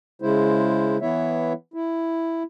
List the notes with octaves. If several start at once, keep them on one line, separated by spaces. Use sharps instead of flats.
C#3 G#3 E4 C5
E3 B3 E4 C#5 E5
E4